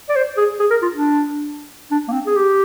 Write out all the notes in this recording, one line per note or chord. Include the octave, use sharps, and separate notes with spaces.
D5
C5
G#4
G#4
A#4
F4
D4
D4
A#3
C4
G#4
G4